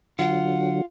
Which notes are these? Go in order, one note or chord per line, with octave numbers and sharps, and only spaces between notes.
D3 F#3 F4 F#5